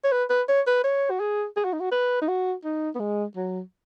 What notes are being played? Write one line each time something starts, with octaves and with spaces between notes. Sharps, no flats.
C#5
B4
B4
C#5
B4
C#5
F#4
G#4
G#4
F#4
D#4
F#4
B4
D#4
F#4
D#4
B3
G#3
F#3